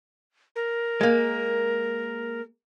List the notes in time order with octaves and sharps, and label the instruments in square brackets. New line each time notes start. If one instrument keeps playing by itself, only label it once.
[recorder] A#4
[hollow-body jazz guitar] G#3 A#3